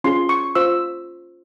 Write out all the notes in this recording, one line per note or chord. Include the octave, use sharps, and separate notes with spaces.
C#4 F4 G#4 C6
C#6
F4 C5 E6